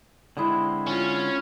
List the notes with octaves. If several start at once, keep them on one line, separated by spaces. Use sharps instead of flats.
D3 G#3 C4 E4 D#5 F#5
C#4 F4